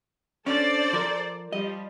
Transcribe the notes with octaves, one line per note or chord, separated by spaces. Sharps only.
C#4 D4 A4 C5 D5
F3 A#4
F3 G3 D#5